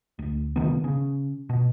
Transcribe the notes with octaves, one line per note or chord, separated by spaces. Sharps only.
D2
A#1 C3 D#3 B3
C#3
B2